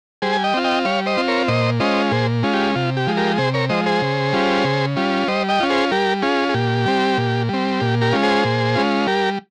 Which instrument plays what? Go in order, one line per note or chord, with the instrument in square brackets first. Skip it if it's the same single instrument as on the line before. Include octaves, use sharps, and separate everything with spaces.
[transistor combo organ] G3 G#4 C5
G#5
D#5 G5
C4 F4
D#5 G5
G3 C#5 F5
C5 D#5
C4 F4
A#4 C#5
A#2 C5 D#5
G#3 C#4 F4 C5 D#5
A#2 G#4 C5
G#3 C#4 F4
G4
C3 F4
G4
F3 G#3
G4 A#4
C3 G#4 C5
A#4 C#5
F3 G#3 C5 D#5
G#4 C5
C#3
G3 C#4 F4
C#3
G3 C#4 F4
G3 C5 D#5
D#5 G5
C#4 F4
G#4 C5
G3 G4 A#4
C#4 F4 G#4
G#4
A#2 G4
G3 C4
A#2
G3 C4
A#2 G4
G4 A#4
G#3 C#4 F4
G#4 C5
A#2
G#3 C#4 F4
G3 G4 A#4